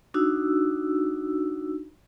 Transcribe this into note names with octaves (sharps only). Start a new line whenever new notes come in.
D4 D#4 F#4 E6